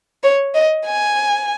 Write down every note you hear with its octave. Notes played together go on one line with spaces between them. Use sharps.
C#5
D#5
G#5